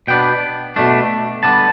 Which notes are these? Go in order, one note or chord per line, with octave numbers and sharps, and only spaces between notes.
B2 B3 D4 G5
B2 A3 D4
D3 G3 B3 A5